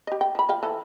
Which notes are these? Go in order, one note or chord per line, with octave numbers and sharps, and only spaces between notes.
G4 D#5
G5
F3 B5
F3 F5 G5
E3 A4 C5